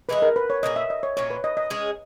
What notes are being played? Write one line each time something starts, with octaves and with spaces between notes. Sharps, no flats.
E3 G#3 D#4 G#4 B4
A#4
B4
C#5
A#2 A#3 D#4 G#4 D#5
E5
D#5
C#5
A#2 F#3 C#4 C#5
B4
D#5
D#5
G#3 C#4 G#4